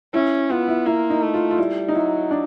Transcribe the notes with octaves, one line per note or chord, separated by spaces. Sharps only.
C#4 E4
B3 F4
E4
A#3 E4
D#4
A3
F4
F4
G3 E4
D#4
F#3 E4
D4